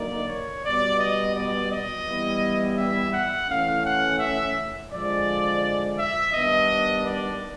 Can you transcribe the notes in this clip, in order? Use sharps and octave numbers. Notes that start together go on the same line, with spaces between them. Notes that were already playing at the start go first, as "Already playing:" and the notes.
Already playing: D3 F#3 A#3 D#4 D5
C#5
B2 G3 B3 D5
D#5
D5
D#5
E3 G3 B3 E4
E5
F#5
E3 A3 C#4 F5
F#5
E5
D3 F3 G#3 D5
E5
D#3 G3 B3 D4 D#5
D5